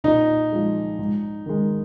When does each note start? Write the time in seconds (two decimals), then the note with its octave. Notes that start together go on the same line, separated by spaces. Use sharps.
0.04 A#2 D#4
0.52 F3 G#3
0.99 G#2
1.46 D#3 G#3